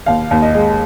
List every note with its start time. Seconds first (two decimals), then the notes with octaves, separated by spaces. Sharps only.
0.06 D#2 F5
0.31 D#2
0.42 D#5
0.54 G#3